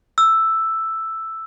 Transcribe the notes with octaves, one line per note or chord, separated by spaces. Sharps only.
E6